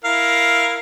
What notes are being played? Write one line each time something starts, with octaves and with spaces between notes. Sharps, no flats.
E4 A#4 F5